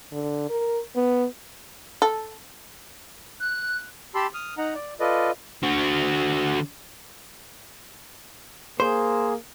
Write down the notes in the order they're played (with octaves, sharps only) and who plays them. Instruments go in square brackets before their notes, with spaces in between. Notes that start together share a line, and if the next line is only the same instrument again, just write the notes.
[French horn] D3
A#4
B3
[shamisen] A4
[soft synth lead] F#6
[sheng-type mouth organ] G4 A5 B5 C6 E6
D#6 F6
D#4 F#5 A#5
D5
F4 A4 B4 D5 D#5
[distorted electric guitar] D3 F#4
[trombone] A#3 [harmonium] G#4 [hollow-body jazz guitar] C5